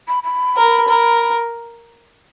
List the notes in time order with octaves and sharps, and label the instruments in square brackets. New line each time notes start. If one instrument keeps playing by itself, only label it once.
[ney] B5
B5
[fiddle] A#4
A#4